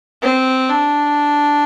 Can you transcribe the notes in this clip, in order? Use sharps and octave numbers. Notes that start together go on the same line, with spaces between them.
C4
D4